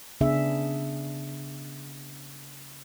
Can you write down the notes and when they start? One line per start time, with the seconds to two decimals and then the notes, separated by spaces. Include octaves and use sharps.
0.21 C#3 B3 D4 G#4 E5